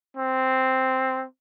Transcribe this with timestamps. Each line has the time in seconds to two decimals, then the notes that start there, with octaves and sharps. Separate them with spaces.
0.17 C4